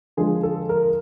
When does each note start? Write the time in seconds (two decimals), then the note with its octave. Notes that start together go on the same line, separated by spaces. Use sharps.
0.17 D3 F3 G#3 G#4
0.43 A4
0.69 A#4